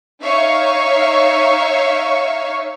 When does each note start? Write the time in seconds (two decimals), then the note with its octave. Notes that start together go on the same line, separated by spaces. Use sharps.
0.21 D#4 C#5 E5 F5 C#6